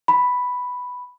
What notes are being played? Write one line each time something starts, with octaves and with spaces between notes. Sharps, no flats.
B5